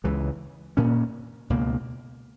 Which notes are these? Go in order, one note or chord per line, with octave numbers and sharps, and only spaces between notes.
C#2 C#3 E3 G#3
A#2 A#3 C#4
C#2 B2 A#3